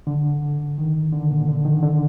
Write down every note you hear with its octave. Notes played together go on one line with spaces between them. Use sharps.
D3
D#3
D3
A#2
D3
D#3
D3